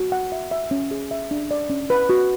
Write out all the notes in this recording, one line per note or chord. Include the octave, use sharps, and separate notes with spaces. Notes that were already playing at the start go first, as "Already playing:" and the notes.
Already playing: F#4
F#5
E5
E5
C#4
G#4
E5
D4
D5
C#4
B4
F#4